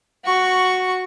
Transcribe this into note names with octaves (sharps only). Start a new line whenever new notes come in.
F#4 C#6